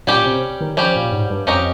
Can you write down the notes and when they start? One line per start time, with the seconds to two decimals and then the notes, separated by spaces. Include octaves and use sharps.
0.07 A#2 G3 C#4 G4
0.25 C3
0.60 D#3
0.77 F3 G3 C#4 G4
0.95 A#2
1.12 G#2
1.30 G2
1.47 F2 C#4 G4 A#4 D#5